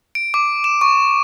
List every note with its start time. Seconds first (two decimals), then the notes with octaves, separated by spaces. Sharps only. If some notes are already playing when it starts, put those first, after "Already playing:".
0.15 D7
0.34 D6
0.64 E7
0.81 C#6